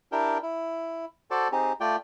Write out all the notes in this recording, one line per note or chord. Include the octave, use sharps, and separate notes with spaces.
D4 E4 G4 A#4 G5
E4
F#4 A4 C5 D5 A5
C4 D#4 G4 G#4
A3 F4 D5 G5